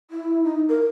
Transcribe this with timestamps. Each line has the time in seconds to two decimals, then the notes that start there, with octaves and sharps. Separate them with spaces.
0.11 E4
0.44 D#4
0.69 A#4